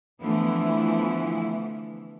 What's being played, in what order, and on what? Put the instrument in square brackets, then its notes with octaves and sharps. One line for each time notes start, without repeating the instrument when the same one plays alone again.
[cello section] D3 E3 F3 A3 B3 E4